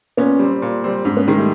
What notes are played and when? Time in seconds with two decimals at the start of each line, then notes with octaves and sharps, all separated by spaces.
0.17 A#2 B3 C#4
0.39 G3 C4
0.62 A#2
0.84 G3 C4
1.05 G#2 C4 D4
1.16 B3 C#4
1.27 D#3 G#3 C4 D4
1.37 G3 A3